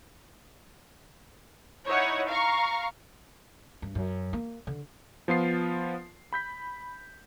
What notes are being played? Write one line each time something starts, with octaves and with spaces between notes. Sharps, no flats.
D#4 E4 C#5 F#5
F5 A#5 C#6
G2
F#2
A#3
D3
F3 B3 F4 C7
B5 G6 B6